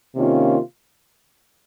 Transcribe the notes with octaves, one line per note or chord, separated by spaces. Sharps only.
C3 D#3 A#3 C#4 F4